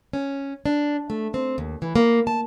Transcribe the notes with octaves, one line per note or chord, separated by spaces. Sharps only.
C#4
D4
A3
C4
D#2
E3
A#3
A5